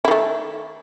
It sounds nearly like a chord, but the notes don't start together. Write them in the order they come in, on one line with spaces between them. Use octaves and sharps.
E4 D#3 A3